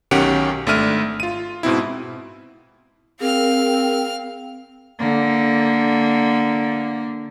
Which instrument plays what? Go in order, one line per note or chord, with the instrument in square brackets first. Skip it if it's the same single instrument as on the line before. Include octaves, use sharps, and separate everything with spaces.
[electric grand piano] B1 D#3 C#4 G4 F#5 D7
G#1 A3 D4 E5 F6 D#7
F4 D#7
G#2 B2 C4 E4
[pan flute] C4 [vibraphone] G#4 A#4 [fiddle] F5 F6
[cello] D3 A#3